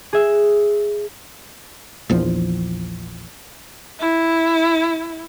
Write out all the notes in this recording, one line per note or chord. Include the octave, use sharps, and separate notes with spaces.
G#4 E5
A#1 E2 F3
E4